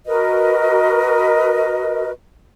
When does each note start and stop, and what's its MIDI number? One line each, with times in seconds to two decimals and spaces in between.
0.06 2.11 66
0.06 2.11 70
0.06 2.11 71
0.06 2.11 75